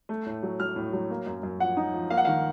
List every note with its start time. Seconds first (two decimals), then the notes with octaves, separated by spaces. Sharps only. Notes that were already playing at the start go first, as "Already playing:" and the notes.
0.09 A3
0.26 A2
0.43 F#3
0.60 F#3 F6
0.76 A2
0.93 F#3
1.10 A#3
1.27 F#2
1.43 F#2
1.60 F3 F#5
1.77 D#4
1.94 F3
2.10 A#3 F5
2.17 F#5
2.25 D#3 F5